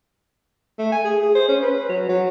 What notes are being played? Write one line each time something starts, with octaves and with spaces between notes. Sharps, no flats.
A3
G#5
G#4
G#4
C5
C#4
B4
F#3
F#3